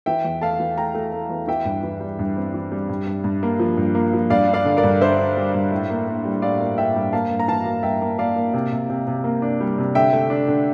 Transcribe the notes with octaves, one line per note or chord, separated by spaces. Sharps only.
E3 E5 G5
E2
A3 F5 A5
E3
A3 G5 A#5
A3
A3
E2
E3 E5 G5
G2
E3
G3
G2
C4
E3
G3
G2
G2
G2
A#3
F3
G2
A#3
F3
G2 D5 F5
D4
D5 F5
D3
A#4 D5
G2
D3 C5 E5
D4
G3
G2
A2
A#3
A#3
G3
A2 D5 F5
A#3
A2 E5 G5
G3
A#3 F5 A5
G2
A#5
E3 F5 A5
A#3
G2 E5 G5
A#3
A#3 D5 F5
A#3
C3
C3
C3
C3
A#3
D4
G3
C3
D3 E5 G5
A3
D4
D3